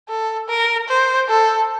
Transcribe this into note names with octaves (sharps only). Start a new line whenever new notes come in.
A4
A#4
C5
A4